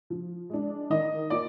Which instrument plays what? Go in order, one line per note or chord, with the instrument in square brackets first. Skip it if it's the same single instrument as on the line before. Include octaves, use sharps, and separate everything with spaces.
[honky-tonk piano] F3
G#3 D4
[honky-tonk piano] D#3 [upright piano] D#5
[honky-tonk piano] A#3 F4 [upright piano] D5